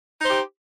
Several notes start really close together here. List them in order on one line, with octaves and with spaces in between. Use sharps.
D#4 C5 G4